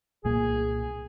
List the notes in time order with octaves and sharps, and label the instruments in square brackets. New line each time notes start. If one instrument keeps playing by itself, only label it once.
[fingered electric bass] C2 A#2 A#3 [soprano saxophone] G#4